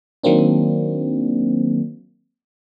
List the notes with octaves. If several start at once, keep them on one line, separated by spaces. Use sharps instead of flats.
D#3 F#3 A#3 C4 D4